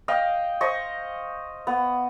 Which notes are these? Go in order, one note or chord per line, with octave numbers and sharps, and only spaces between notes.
D#5 F5 G5
C5 D#5 C#6
B3